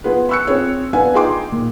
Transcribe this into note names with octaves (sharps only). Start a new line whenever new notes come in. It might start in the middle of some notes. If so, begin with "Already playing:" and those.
B3 F4 G#4 B4
B5 C#6 E6 F#6 C#7
C4 F4 G#4 C#5
B3 D4 B4 F5 G#5
D#4 F4 G#4 G5 C6 D6
A#2